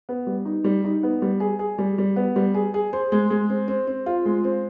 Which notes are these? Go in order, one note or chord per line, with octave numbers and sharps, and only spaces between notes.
B3
G3
D#4
G3
D#4
B3
G3
G#4
G#4
G3
G3
B3
G3
G#4
G#4
C5
G#3
G#3
C4
C4
C4
F4
G#3
C4